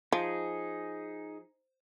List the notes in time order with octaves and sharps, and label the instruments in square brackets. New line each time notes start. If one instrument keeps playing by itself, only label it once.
[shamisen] F3 [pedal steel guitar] D#4 G#4